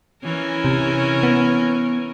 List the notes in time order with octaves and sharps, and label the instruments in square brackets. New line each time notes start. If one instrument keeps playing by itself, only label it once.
[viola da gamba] E3 C#4 A#4
[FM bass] C3
B3